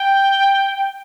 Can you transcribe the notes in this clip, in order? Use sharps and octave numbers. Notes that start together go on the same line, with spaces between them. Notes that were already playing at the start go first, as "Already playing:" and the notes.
Already playing: G5